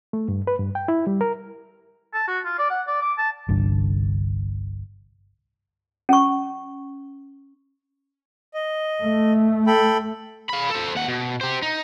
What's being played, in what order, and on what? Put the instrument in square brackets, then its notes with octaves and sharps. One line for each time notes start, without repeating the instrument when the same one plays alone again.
[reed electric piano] A3
G2
B4
G2
G5
E4
G3
A#4
[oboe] A5
F#4
F4
D5
F#5
D5
D6
A5
[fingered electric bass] G1 C2 G2 D3
[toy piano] C#4 C#6
[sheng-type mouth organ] D#5
[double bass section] A3
[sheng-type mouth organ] A4 G5 B5
[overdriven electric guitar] F5 B5
A4 C5
D#2 F#5
B2
G4 C5
D#4